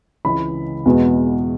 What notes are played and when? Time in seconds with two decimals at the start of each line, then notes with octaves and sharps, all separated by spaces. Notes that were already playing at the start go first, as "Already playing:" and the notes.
0.25 C#2 C#3 E3 B5
0.85 E2 B2 G#3 B3